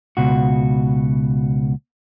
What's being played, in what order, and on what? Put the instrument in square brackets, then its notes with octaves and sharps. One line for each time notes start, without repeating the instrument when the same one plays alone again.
[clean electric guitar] C#2 B2 F#4